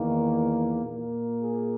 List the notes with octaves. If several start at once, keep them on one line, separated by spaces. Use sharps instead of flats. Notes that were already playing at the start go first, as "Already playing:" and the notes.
Already playing: E2 D#3 A#3
A#2 A#3
G#4